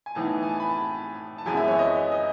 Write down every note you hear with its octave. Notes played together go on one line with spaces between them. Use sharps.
G#5
A2 E3 B3 D#4 A5
G#5
A5
B5
A5
A5
F#2 E3 G#3 B3 G#5
E5
C#5
D#5
D#5